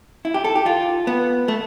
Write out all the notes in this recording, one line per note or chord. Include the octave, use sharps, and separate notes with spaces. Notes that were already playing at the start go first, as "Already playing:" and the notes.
E4
G4
A4
G4
F4
B3
A3